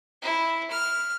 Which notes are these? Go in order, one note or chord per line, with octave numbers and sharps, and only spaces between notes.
E4
F6